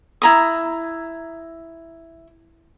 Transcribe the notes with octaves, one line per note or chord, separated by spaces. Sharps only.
E4 A#5 D#6